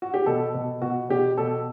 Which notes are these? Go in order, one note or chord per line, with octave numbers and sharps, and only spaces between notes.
F#4
G4
B2 A4
B2
B2 F#4
B2 G4
B2 A4